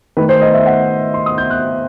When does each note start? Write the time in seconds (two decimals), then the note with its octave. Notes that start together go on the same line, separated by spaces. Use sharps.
0.17 D#3 A3 B4
0.29 C5
0.41 D#5
0.54 E5
0.66 F#5
1.14 C6
1.26 D#6
1.38 G6
1.51 F#6